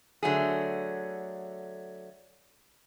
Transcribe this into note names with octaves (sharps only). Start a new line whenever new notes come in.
D3 F#3 A3 G#4